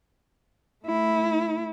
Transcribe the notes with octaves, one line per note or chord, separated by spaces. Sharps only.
A3 E4